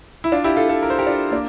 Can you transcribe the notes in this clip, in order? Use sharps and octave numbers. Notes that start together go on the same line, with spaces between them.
E4
D4 F4
E4 G4
F4 A4
F4 A4
A#4
C5
G4 A#4
D4 F4
A#3 D4